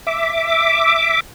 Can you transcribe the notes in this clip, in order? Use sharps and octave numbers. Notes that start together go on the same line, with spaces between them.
E5 D6